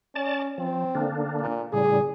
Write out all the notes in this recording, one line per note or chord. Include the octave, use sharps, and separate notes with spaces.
C#4 D5 A5
F3 C4
D3 A#3 D4
A#2
A2 C#3 G3 G#4